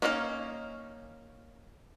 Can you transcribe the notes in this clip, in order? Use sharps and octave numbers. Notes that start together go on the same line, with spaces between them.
A#3 C#4 D#4 A#4 F5